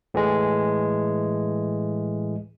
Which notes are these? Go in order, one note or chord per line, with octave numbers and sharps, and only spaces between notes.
A2 E3 G#3